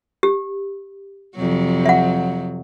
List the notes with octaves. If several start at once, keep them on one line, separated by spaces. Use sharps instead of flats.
G4
F2 C3 F#3
E5 F#5